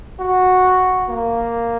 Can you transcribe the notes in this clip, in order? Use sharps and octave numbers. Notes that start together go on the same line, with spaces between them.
F#4
A#3